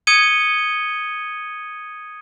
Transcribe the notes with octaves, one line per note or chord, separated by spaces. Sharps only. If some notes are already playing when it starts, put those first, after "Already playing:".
D#6 G#6 C#7 D#7 G7